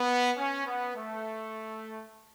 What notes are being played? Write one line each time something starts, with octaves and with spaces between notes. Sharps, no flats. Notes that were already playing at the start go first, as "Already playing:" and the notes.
Already playing: B3
C#4
B3
A3